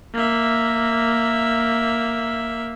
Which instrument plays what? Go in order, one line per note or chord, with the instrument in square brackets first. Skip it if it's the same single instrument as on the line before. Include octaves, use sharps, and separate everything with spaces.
[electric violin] A#3 E5